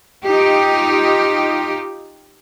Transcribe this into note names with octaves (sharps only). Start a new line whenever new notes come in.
D#4 F4 G4